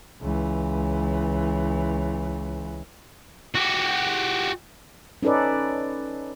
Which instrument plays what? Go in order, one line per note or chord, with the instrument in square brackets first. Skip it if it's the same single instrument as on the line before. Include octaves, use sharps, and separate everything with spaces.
[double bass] C#2 E3
[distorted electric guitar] F#4 G4
[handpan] C#4 D#4 A4 B4 D5